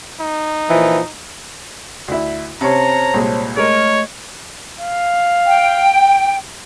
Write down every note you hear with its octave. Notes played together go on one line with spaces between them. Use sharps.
D#4
A#2 E3 F3
D2 E4
C3 C#4 C5 C#5 A5 A#5
C2 A#2 G#3
G#3 A3 A#4 C#5 D#5
F5
G5